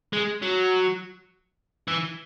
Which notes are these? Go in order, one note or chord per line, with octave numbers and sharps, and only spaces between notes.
G#3
F#3
E3